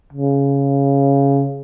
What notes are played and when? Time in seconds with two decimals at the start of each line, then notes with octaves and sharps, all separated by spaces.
0.13 C#3